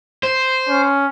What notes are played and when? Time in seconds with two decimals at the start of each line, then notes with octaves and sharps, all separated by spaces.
0.23 C5
0.68 C#4